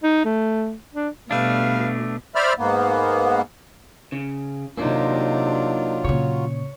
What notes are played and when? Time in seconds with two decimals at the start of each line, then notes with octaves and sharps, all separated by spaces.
0.03 D#4
0.24 A3
0.94 D4
1.31 B2 G3 A3 D4 B4 F5
2.35 C5 D5 E5 B5 F6
2.58 G#2 A#3 B3
4.12 C#3
4.77 C3 F#3 A#3 D4 D#4 F4
6.04 A#2 C#3 C#5